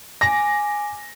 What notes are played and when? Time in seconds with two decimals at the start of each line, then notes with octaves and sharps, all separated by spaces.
0.21 G#5 D6 A#6